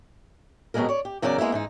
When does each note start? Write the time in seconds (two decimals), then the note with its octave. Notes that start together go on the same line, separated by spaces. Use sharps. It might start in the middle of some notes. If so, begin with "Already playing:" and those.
0.74 F2 B2 F3 F#3 G#3 A#4
0.89 C#5 D5
1.05 G4
1.22 E2 C#3 F#3 A#4 B4 D5
1.38 G#3 A#3 B3 E4
1.52 G#2 E3 D#4